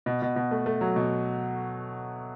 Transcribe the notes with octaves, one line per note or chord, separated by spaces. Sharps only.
B2
B2
B2
A3
A3
F#3
B2